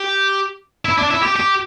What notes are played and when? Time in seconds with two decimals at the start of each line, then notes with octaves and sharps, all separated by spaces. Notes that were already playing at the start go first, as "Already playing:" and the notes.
Already playing: G4
0.85 E4
0.98 D4
1.10 E4
1.23 G4
1.36 G4